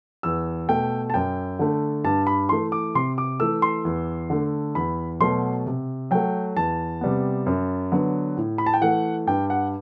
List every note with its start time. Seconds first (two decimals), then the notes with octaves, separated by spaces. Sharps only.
0.23 E2 E6
0.69 B2 A3 G5
1.10 A5
1.14 F#2 G5
1.59 D3 A3
2.04 G2 A5
2.27 B5
2.49 E3 A3 C6
2.72 D6
2.95 C3 C6
3.18 D6
3.40 E3 A3 E6
3.62 C6
3.85 E2
4.30 D3 A3
4.75 E2 B5
5.20 B2 F#3 A3 C6
5.66 C3
6.11 F#3 A3 G5
6.56 E2 A5
7.01 C3 G3 B3
7.46 F#2
7.92 D3 F#3 B3
8.37 A2
8.58 B5
8.66 A5
8.74 G5
8.81 E3 A3 F#5
9.27 G2 G5
9.50 F#5